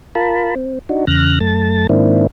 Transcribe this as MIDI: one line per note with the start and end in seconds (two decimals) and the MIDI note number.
0.15 0.55 65
0.15 0.55 70
0.15 0.55 81
0.15 0.55 83
0.56 0.79 60
0.89 1.05 62
0.89 1.05 63
0.89 1.05 66
1.07 1.39 40
1.07 1.39 49
1.07 1.39 89
1.07 1.39 90
1.07 1.39 94
1.40 1.87 42
1.40 1.87 57
1.40 1.87 81
1.40 1.87 93
1.89 2.27 44
1.89 2.27 51
1.89 2.27 58
1.89 2.27 60
1.89 2.27 62
1.89 2.27 64